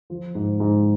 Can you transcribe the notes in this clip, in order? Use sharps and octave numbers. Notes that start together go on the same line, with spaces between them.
F3
G#2
G#2